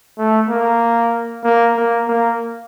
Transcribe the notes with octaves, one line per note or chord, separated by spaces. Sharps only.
A3
A#3
A#3
A#3
A#3